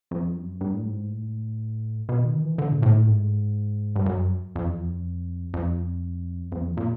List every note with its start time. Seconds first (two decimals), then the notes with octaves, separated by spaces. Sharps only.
0.11 F2
0.36 F#2
0.61 G2
0.74 A2
0.86 G#2
1.10 A2
2.09 B2
2.25 D#3
2.42 E3
2.58 D3
2.72 A#2
2.82 A2
3.07 G#2
3.96 G2
4.06 F#2
4.55 F2
4.66 E2
4.76 F2
5.54 F2
6.52 F2
6.60 E2
6.64 F2
6.77 A#2